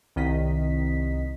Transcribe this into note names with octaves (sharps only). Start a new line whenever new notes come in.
C2 D#3 D#5 B6